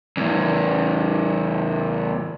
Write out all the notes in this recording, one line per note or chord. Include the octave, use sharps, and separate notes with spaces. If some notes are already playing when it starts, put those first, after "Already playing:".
E2 A2